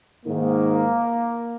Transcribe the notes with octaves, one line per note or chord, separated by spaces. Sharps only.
G#2 D#3 A#3